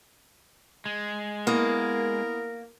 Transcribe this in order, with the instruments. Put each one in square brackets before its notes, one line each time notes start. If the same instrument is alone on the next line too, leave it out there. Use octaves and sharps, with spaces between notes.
[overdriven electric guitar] G#3
[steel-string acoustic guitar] A#3 [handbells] B3 E4 D#6 [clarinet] A#4